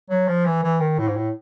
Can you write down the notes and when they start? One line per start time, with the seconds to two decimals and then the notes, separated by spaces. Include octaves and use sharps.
0.10 F#3
0.28 F3
0.45 E3
0.63 E3
0.80 D#3
0.98 A2
1.08 G#2
1.16 A2